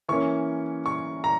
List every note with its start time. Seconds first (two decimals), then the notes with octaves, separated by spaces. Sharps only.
0.08 E3 A#3 C#4 C#6
0.86 C#6
1.24 A#5